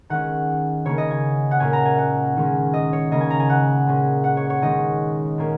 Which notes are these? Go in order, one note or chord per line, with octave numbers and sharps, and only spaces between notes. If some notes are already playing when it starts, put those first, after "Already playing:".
D#3 G#3 C#4 F#5
C#3 A#3 C#4 C#5
D#5
G#5
F#5
A#2 A#3 C#4 G#5
A#5
G#5
F#5
D#3 G#3 C#4
D#5
C#5
C#3 A#3 C#4 D#5
G#5
A#5
G#5
F#5
A#2 G#3 C#4
F#5
C#5
C#5
D#3 G#3 C#4 D#5
A#2 A#3 C#4